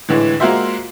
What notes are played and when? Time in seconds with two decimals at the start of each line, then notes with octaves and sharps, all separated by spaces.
0.09 A2 D3 E3 G#3
0.40 G#3 A#3 F4 F#4 C5 E5